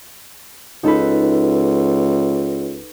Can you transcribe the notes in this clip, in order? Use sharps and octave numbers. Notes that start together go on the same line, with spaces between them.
C#2 D#4 A4 B4